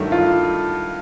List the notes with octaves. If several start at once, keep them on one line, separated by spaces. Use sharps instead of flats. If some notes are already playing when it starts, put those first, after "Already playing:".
Already playing: G2 D#3 F#3 A3
F4